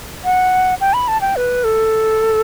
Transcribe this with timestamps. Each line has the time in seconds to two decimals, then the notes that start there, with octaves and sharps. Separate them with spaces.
0.25 F#5
0.81 G5
0.93 B5
1.08 A5
1.21 G5
1.36 B4
1.64 A4